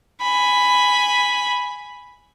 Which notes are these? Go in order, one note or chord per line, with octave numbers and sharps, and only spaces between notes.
G#5 B5